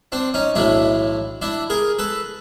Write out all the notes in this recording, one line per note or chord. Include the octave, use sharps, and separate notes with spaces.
C4 D4
C#4 D#4
B1 A2 E3 D4 E4
D4 E4
G#4 A#4
A4 B4